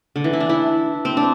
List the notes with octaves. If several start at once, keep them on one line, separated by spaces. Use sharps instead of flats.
D3
E3
E4
D4
E4
C4
D4